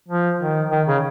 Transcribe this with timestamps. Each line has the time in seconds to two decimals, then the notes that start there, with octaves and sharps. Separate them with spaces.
0.08 F3
0.40 D#3
0.71 D#3
0.88 C#3